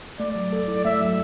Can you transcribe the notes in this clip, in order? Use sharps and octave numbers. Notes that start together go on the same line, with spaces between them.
A3 D5
F#3
A4
E4
A3 E5
F#3